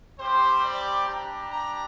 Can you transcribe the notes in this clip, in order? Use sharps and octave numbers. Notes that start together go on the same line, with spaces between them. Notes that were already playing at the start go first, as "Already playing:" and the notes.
G3 C4 G4 C5
D5
G3 D4 G4 A#5
A#5